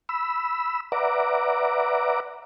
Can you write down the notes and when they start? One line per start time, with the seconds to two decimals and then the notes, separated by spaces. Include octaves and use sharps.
0.09 B5 E6
0.92 B4 D5 E5 F#5 A#5 D6